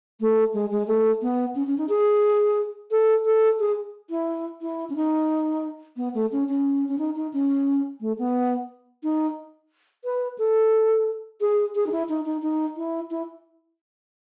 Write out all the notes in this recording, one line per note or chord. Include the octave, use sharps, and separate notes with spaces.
A3
G#3
G#3
A3
B3
C#4
C#4
D#4
G#4
A4
A4
G#4
E4
E4
C#4
D#4
B3
A3
C#4
C#4
C#4
D#4
D#4
C#4
A3
B3
D#4
B4
A4
G#4
G#4
D#4
E4
D#4
D#4
D#4
E4
E4